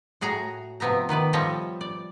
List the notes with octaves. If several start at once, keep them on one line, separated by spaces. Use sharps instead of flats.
A2 F#4 G#4 C#5 A#5
C3 F3 B3 E5 A#5
D#3 B3 B4 D5
F3 G3 A4 C#5 D#5 E5
D5